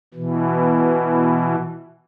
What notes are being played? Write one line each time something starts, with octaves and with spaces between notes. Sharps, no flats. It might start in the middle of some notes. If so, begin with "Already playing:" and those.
B2 E3